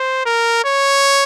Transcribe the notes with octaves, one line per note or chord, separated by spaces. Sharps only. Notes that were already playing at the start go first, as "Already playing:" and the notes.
Already playing: C5
A#4
C#5